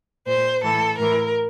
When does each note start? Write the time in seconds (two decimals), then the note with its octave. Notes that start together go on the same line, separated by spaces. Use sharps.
0.26 A#2 C5
0.63 A2 E3 A4
0.98 A2 E3 A#4